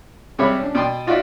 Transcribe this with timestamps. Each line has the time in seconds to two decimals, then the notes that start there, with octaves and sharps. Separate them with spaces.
0.39 C3 G3 G#3 C#5 E5 B5
0.59 C#4 D4
0.75 B2 D5 G5 C6
1.07 D#4 F4 F#4 D5 E5